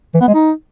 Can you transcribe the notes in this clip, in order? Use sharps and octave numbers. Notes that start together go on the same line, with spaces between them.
E3
B3
G#3
D#4